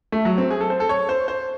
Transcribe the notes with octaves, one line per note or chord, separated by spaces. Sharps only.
A3
F#3
C4
G#4
A4
C5
A4
C#5
C5
C5